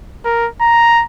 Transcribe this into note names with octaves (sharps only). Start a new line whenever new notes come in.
A#4
A#5